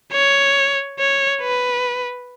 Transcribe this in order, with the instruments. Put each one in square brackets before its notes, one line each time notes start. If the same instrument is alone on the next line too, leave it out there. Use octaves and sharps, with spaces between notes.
[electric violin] C#5
C#5
B4